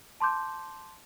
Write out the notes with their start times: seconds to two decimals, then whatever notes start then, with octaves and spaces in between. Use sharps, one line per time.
0.20 A5 C6 D6 G6